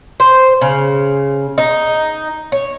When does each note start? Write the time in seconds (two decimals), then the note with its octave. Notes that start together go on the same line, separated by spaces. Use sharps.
0.20 C5
0.61 C#3
1.58 D#4
2.52 C#5